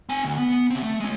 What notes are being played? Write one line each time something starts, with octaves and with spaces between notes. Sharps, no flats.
C4 G#5
D2
B3
C#3 C4
A3
G#3 C#4